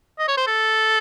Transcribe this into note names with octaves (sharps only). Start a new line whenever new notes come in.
D#5
C#5
C5
A4